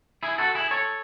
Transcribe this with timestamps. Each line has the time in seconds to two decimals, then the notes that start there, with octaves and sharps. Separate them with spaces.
0.23 E4 G#4
0.38 F#4 A4
0.55 E4 G#4
0.71 A4 C#5